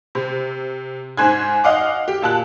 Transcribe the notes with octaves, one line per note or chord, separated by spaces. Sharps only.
C3
G#2 C5 G#5 F#6 G#6
D#5 F5 F#5 D6
G4
A#2 A5 F#6